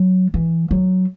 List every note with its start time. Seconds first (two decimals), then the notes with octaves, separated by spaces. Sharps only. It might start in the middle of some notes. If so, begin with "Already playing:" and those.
Already playing: F#3
0.34 E3
0.71 F#3